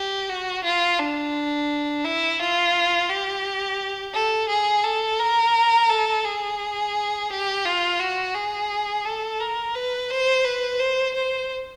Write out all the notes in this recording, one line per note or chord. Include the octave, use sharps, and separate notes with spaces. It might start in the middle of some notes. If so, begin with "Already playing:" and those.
Already playing: G4
F#4
F4
D4
E4
F4
G4
A4
G#4
A4
A#4
A4
G#4
G4
F4
F#4
G#4
A4
A#4
B4
C5
B4
C5
C5